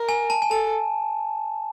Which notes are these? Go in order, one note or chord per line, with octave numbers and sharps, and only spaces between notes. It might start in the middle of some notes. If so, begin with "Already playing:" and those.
Already playing: A#4
G#5
A5
G#5
A4 A5